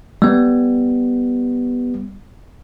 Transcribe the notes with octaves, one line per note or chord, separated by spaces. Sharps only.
G3 B3